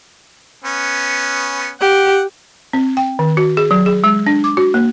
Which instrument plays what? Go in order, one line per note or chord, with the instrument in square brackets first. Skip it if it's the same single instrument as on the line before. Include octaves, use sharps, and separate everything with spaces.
[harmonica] B3 C#4
[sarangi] G4 [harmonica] F#5
[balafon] C4
G5
D#3
F#4
G#4
F#3
G#4
G#3
D4
D6
F#4
A#3